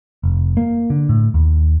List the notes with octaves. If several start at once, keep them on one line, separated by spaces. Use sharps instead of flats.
F1
A#3
D3
A2
D#2